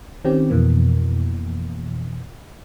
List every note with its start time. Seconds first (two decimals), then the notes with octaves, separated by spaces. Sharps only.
0.25 D#3 C4 C#4 G4
0.50 F2 B2 E3 A#3